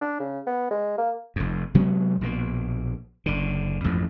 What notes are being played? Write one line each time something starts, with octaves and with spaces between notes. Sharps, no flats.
D4
C#3
B3
G#3
A#3
F1 F2
C3 F#3 G#3 B3
A#1 B2 E3 A#3
F#1 D3
A1 F2 G#2 F3